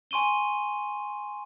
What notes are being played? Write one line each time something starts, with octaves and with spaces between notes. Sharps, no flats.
G#5 C6 C#6 D#7 G7